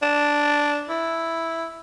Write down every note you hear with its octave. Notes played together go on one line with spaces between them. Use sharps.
D4
E4